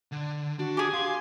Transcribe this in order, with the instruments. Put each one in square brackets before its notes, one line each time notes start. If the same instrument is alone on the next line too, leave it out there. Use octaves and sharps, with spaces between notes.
[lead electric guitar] D3
[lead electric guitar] D4 [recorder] F#4
[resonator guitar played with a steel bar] G4 G#4 [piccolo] G#5
[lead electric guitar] F5 [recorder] C6